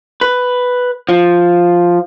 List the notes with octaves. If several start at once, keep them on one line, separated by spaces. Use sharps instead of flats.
B4
F3